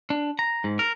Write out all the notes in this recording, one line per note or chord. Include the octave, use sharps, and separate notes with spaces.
D4
A#5
G#2
A#4